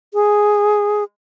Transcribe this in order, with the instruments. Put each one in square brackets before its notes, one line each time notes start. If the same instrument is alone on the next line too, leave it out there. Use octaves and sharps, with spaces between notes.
[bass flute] G#4